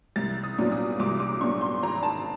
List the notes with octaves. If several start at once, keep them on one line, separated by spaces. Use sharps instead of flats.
C2 A6
D#6
A#2 F#3 B3 D4
D#6
C2 D6
D6
A#2 F#3 B3 D4 C#6
C6
G#1 A#5
A5